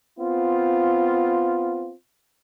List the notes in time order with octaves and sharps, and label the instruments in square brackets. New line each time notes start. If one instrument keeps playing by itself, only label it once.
[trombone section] B3 C4 F4